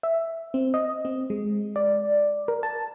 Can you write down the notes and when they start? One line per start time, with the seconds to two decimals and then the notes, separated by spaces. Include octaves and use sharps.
0.03 E5
0.54 C4
0.74 D#5
1.05 C4
1.30 G#3
1.76 D5
2.48 A#4
2.63 A5